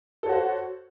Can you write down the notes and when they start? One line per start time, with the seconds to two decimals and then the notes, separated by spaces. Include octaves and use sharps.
0.23 A4
0.26 C#5
0.29 F#4
0.32 C5